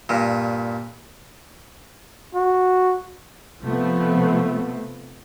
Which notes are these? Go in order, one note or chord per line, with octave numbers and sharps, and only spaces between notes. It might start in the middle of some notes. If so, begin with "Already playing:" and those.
G2 A#2
F#4
C3 F3 A3 B3